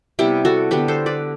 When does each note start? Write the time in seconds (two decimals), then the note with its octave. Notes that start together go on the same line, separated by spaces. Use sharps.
0.19 C3 G3 B3 E4 G4
0.45 F#4 A4
0.71 D3 G3 B3 G4 B4
0.88 A4 C5
1.06 B4 D5